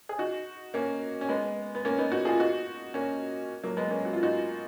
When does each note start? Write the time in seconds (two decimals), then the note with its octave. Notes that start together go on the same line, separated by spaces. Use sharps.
0.09 G#4
0.18 D#4 F#4
0.74 A#3 C#4
1.21 C#4
1.29 G#3 B3
1.75 B3
1.85 A#3 C#4
1.98 B3 D#4
2.12 D#4 F#4
2.25 F4 G#4
2.39 D#4 F#4
2.94 A#3 C#4
3.64 F#3 A#3
3.77 G#3 B3
3.91 A#3 C#4
4.05 F#4
4.13 F4
4.23 D#4 F#4